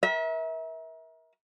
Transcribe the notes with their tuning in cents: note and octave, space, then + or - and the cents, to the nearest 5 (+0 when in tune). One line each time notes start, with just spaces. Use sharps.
A#4 +30 E5 -30